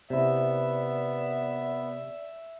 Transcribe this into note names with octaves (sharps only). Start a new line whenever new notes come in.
C3 B3 E4 D5 E5